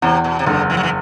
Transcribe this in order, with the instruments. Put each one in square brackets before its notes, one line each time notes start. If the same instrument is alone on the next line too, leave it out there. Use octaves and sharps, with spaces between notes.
[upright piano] E2 [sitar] C3
[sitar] B2
C3
[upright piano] F#1 [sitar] D3
[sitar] E3
F#3
E3